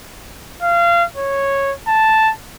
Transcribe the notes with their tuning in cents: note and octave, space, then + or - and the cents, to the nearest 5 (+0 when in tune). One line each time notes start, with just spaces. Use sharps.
F5 -25
C#5 -10
A5 +0